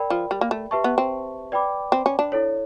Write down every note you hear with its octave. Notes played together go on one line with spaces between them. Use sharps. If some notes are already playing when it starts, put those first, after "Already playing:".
Already playing: A#4 D5 G5 B5
F3
G3
A#3
A3
G4 B4 E5 A5 C#6
B3
C4
B4 D5 G5 B5 D6
C4
C#4
D4
E4 A4 C#5